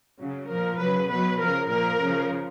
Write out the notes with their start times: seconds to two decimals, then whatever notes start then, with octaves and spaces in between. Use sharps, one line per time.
0.20 C#3 F#3
0.50 A#2 F3 A#4
0.80 C#3 F#3 B4
1.10 B2 F#3 B4
1.40 C#3 F3 A#4
1.71 A#2 F3 A#4
2.01 C#3 F3